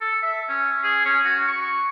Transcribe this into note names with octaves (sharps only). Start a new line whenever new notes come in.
A4
E5
C#4
G#4
C#4
F#4
C#6